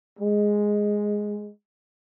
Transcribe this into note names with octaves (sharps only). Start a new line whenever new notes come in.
G#3